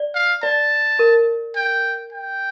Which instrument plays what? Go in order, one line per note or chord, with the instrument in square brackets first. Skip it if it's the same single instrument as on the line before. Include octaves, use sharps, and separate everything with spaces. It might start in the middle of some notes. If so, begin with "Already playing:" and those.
Already playing: [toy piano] D5
[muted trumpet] F5
[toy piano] D5 [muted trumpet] A5
[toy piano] A#4
[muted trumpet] G5
G5